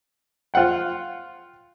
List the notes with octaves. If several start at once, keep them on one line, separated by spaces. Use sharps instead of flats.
F4 C5 F#5 G5